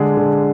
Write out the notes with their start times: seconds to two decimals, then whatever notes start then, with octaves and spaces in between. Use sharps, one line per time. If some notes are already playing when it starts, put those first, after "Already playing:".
Already playing: D3 G#3 D4 G#4
0.17 D3